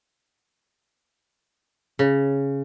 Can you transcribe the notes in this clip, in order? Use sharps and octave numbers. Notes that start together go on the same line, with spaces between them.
C#3